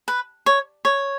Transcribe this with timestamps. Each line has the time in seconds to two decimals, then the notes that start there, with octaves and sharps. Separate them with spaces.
0.08 B4
0.46 C#5
0.85 C#5